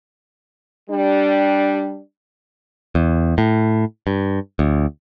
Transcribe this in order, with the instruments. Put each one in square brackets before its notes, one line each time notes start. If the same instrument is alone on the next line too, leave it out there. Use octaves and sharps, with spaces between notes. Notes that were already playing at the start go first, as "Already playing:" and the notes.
[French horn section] G3 D4
[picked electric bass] E2
A2
G2
D2